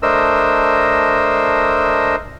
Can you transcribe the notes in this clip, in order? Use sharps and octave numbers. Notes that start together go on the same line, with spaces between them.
A3 D4 A#4 C5 D#5 E6